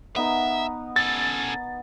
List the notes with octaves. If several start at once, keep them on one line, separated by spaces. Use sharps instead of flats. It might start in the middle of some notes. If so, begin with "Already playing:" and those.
B3 D#4 A#4 E5
C#4 A4 A6